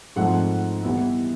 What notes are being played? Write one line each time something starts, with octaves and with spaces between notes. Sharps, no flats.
G#2 F3 A3 C4 F#5
E3 G3 B3 E4